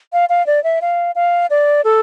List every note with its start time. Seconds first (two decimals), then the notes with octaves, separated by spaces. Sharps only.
0.13 F5
0.29 F5
0.47 D5
0.64 E5
0.82 F5
1.15 F5
1.50 D5
1.84 A4